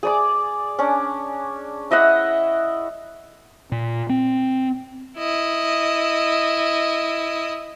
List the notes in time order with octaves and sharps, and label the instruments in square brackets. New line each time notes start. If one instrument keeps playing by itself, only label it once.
[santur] G#4 D5 D6
C#4 D4
E4 D#5 E5 F#5
[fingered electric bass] A#2
C4
[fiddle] E4 D#5